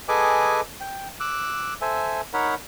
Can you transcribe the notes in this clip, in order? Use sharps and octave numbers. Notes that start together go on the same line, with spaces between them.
G#4 A4 B4 D#5 G#5 D6
G5
D6 E6 F#6
A4 C5 E5 G#5
D#4 A#4 C#5 F#5 B5